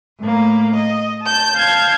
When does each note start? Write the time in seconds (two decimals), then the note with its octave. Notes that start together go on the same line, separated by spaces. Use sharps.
0.20 A2 A#3
0.74 D#5
1.24 A5 G6
1.57 F5 A5 G6 G#6